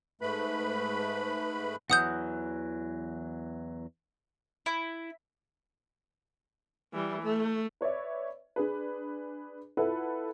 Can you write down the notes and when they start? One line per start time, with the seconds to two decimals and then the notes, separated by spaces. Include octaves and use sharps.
0.21 G#2 A3 B4 B5
1.90 E2 E3 F#3 F#5 D#6 G6
4.66 E4
6.94 E3 G3
7.22 A3
7.81 B4 C#5 D5 E5
8.56 D4 G#4 B4
9.77 E4 F4 A4 B4 F#5